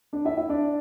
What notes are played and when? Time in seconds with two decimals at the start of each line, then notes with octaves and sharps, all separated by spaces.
0.13 D4 D5
0.25 E4 E5
0.37 E4 E5
0.49 D4 D5